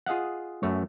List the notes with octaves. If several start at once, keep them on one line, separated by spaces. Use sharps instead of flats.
F4 G#4 D#5 F5 F#5
F#2 A3 C#5